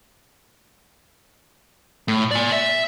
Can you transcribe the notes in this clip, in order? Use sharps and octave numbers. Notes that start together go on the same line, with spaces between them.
A2
D5 G#5
E5